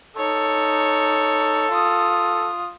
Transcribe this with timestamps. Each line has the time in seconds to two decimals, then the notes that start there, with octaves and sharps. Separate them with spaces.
0.17 D#4 A4 C#5
1.70 F4 D#6